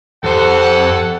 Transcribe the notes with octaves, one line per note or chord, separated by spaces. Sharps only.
F2 G4 A4 C5 F#5